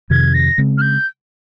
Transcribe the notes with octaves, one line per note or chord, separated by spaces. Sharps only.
F2 C3 D#3 G#6
A#6
C#3 G#3 C4
F6
G6